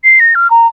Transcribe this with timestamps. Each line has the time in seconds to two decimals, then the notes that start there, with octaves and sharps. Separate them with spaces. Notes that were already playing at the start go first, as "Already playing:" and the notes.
0.04 C7
0.20 A#6
0.35 F6
0.50 A#5